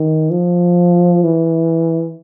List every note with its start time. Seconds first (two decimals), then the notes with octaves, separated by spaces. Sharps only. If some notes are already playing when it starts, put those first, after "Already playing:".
Already playing: D#3
0.31 F3
1.24 E3